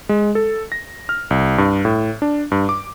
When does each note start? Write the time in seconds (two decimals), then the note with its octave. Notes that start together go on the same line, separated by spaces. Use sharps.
0.09 G#3
0.35 A4
0.72 A#6
1.09 F6
1.31 C2
1.58 G2
1.85 A2
2.22 D4
2.52 G2
2.69 D6